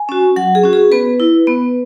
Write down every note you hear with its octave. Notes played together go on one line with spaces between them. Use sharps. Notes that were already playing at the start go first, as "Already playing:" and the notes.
Already playing: G#5
C#4 F#4
F#3 F#5
G#4
C#4 F#4
G#4
B3 B4
E4
B3